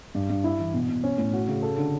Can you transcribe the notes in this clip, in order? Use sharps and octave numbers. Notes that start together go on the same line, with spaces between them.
G2
G2
E4
E3
B2
B2
C#4
A2
F#4
C#3
A4
D3